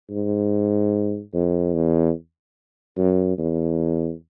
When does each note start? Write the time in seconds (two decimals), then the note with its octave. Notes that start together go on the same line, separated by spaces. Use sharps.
0.10 G#2
1.34 F2
1.74 E2
2.97 F#2
3.38 E2